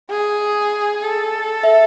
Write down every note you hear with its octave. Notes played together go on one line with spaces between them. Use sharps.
G#4
A4
E5